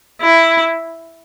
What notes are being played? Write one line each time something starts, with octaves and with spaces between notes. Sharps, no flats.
E4